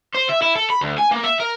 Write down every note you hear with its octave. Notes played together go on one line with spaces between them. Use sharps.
C5
E5
E4
A4
B5
D2
G#5
A#3
E5
A#4